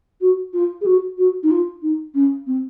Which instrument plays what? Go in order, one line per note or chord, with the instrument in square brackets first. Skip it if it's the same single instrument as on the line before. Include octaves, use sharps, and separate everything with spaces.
[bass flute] F#4
F4
G#4
F#4
F#4
D#4
F4
D#4
C#4
C4